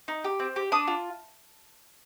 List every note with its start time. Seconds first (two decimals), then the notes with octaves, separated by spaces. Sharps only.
0.08 D#4
0.24 G4
0.40 C4
0.56 G4
0.72 D4 D#6
0.88 F4